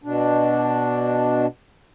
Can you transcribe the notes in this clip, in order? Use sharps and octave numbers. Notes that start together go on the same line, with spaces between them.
B2 D4